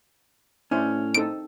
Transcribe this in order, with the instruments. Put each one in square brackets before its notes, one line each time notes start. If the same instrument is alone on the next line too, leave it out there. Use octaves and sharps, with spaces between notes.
[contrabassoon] A2 [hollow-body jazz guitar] C#4 [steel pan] D4 E4 C5
[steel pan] C4 D#4 A4 [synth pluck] D7